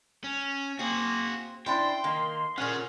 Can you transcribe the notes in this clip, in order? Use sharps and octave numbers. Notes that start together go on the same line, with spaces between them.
C#4
A#3 C4 F#4 G#4
D4 E4 C5 G5 C6
D#3 A#3
A#2 C#4 G#4 F#5 F6